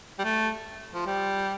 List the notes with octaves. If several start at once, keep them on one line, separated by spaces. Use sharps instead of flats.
G3
A3
F3
G3